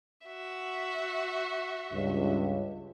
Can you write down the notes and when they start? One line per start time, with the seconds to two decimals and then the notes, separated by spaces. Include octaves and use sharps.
0.26 F#4 E5
1.92 C#2 G2